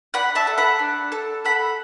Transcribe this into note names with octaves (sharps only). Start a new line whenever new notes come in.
D4 F#5 B5
E5 A5
A4
F#5 B5
D4
A4
A4 F#5 B5